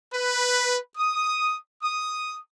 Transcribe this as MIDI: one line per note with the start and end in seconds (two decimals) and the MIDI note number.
0.13 0.77 71
0.97 1.54 87
1.82 2.37 87